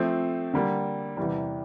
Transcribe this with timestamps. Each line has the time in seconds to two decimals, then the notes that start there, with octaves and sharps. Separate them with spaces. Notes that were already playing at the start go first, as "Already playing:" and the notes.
Already playing: F3 A3 C4
0.54 D3 G3 A#3
1.17 E2 C3 E3 G3